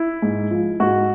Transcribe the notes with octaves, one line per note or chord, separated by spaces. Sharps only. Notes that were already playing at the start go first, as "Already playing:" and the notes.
Already playing: E4
G#2
F3
G#2 F#4